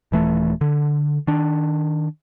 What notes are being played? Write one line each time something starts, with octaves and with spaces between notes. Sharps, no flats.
D#1 E3 A3
D3
D#3 D4